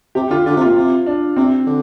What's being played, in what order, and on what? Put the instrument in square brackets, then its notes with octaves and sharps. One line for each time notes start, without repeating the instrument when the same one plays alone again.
[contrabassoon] C3 [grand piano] G4
[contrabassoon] D3 [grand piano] F4
[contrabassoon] D3 [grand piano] F4
[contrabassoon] C3
[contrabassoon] A#2 [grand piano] F4
[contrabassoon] C3 [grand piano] F4
[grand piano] D4
[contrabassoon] C3 [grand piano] C4
[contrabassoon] D3